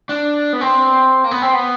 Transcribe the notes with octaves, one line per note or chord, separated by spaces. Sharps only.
D4
B3
C4
A#3
B3
C4
B3